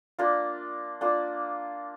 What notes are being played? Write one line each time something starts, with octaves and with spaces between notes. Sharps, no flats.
A#3 D4 F4
A#3 D4 F4